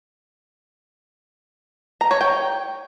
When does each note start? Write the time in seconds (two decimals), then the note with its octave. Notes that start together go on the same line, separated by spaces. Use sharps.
2.01 A#5
2.11 C#5
2.21 G5